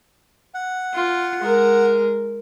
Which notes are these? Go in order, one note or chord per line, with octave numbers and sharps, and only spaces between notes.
F#5
F4
G#3 A#4